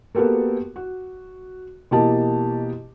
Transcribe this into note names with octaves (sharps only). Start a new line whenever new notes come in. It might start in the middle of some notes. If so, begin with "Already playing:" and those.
A#3 B3 F#4 G4 A4 A#4
F#4
B2 E3 A#3 G4 D#5 A5